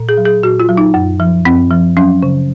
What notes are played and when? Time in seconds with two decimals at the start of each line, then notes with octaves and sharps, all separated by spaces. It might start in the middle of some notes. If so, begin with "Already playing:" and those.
Already playing: A#2
0.09 G#4
0.17 F#3
0.25 G#4
0.43 A#2 F#4
0.60 F4
0.69 F#3
0.77 D#4
0.94 F#2
1.20 F3
1.45 F#2 C4
1.71 F3
1.97 F#3 C#4
2.23 C#3